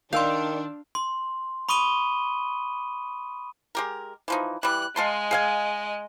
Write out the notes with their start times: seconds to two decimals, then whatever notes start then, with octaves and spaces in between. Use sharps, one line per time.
0.13 D#3 D4 F5 C6 E6 G6
0.95 C6
1.69 B5 C#6 D#6 D#7 G7
3.75 G#3 G4 A#4
4.28 E3 F3 D#4
4.63 E3 G3 F#6
4.96 G#3 D#5 F5 A5 C6
5.31 G#4 F5 G#5